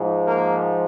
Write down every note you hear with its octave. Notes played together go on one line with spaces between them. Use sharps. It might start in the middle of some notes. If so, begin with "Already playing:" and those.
Already playing: G#2 F3
A#3